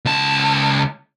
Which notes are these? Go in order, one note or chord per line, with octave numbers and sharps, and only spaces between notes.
C#2 A5